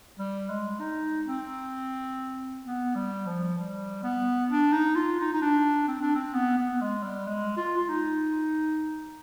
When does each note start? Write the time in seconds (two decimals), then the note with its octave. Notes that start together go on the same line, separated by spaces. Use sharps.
0.19 G3
0.50 G#3
0.80 D#4
1.27 C4
2.65 B3
2.95 G3
3.26 F3
3.58 G3
4.03 B3
4.50 D4
4.72 D#4
4.95 F4
5.20 D#4
5.33 D#4
5.41 D4
5.88 C4
6.01 D4
6.15 C4
6.34 B3
6.57 B3
6.81 G#3
7.03 G3
7.27 G#3
7.57 F4
7.77 F4
7.89 D#4